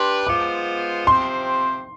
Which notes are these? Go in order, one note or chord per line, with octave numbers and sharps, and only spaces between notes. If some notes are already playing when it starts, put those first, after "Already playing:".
Already playing: D4 G4 B4 C6
G#3 B3 F4 C5 D6
C3 F3 C4 G4 C5 C6